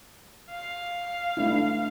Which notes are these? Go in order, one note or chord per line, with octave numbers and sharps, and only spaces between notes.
F5
A3 D4 E4